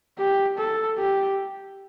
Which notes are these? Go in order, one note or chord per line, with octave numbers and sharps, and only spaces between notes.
G4
A4
G4